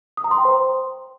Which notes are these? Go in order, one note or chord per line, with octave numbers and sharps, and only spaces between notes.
D#6
A#5
C6
G5
C5